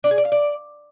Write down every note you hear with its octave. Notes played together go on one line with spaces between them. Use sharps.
D4
G#4
D5
F5
D5